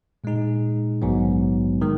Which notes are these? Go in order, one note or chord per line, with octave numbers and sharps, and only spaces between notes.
A#2 G#3 D#4 G#4
A#1 G#2 D#3 F#3 B3
D#3 G#3